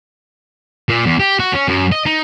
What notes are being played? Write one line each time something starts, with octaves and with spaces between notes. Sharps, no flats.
A#2
E2
G4
F#4
C#4
F#2
D#5
D#4